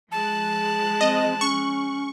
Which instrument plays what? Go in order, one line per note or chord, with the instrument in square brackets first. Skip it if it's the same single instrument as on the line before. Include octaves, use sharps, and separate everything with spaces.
[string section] F3 G#3 F#6 [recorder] A5
[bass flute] C4 [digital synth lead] D#5
[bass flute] C#4 [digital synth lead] C#6